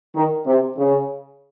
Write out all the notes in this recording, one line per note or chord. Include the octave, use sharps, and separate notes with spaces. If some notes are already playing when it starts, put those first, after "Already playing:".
D#3
C3
C#3